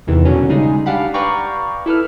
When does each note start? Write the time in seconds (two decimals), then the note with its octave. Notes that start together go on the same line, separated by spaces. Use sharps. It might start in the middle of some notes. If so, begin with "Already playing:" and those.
0.07 E2 C3 D#3 E3
0.25 B2 D3 F#3 C#4
0.49 C#3 G3 G#3 D#4 G#4
0.86 D4 G4 F5 F#5 B5
1.14 B4 D5 F5 G5 A#5 C#6
1.86 E4 A4 B4 F6